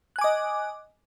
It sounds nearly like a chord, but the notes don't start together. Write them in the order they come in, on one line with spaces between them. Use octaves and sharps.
F#6 G#5 D6 D#5